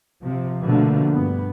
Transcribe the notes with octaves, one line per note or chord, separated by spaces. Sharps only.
C3 F3
B2 D3 F3 A3 A#3
G2 B3